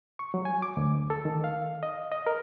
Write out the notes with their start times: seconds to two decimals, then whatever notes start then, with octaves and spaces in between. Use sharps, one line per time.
0.19 C#6
0.34 F#3
0.45 G#5
0.62 D6
0.77 D2
1.10 A4
1.25 D#3
1.44 F5
1.83 D#5
2.11 D#5
2.26 A#4